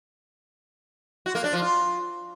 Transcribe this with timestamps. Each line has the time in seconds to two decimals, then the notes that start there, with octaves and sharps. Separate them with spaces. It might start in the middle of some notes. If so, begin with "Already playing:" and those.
1.26 F#4
1.35 A#3
1.44 D4
1.53 F3
1.62 F4